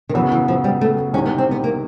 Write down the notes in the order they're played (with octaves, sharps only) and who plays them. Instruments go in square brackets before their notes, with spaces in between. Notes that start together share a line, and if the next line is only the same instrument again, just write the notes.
[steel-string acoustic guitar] D#3
[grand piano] F#2 C#3 F#3 B3 [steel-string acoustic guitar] E3
[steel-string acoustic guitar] E3
F3
G3
A3
[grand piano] C2 C3 D#3 [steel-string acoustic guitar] C#4
[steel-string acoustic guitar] B3
C4
B3
A#3